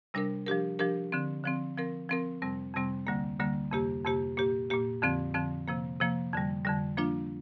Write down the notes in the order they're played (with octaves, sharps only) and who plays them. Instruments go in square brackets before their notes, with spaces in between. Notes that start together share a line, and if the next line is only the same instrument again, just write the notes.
[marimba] C3 G3 D4 A#4
F3 D4 G4 A#4
F3 D4 G4 A#4
D3 F3 C4
D3 F3 C4
F3 C4 A#4
F3 C4 A#4
F2 C3 G3 C4
F2 C3 G3 C4
D2 D3 G3 A#3
D2 D3 G3 A#3
F2 C3 A#3 G4
F2 C3 A#3 G4
A#2 A#3 G4
A#2 A#3 G4
F2 D3 F3 C4
F2 D3 F3 C4
C3 F3 A#3
C3 F3 A#3
F2 D3 G3
F2 D3 G3
F3 A#3 D4 F4